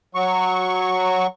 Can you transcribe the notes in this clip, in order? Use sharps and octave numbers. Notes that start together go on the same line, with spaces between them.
F#3 C#6